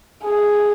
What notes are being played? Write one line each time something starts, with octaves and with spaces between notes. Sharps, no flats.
G#4